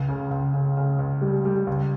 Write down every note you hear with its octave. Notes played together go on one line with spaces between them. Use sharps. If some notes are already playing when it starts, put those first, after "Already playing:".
Already playing: C#2
C#3
C#2
C#3
C#3
C#2
G3
G3
C#2